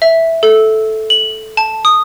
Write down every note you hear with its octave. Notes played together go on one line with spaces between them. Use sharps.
E5
A4
F#7
A5
D#6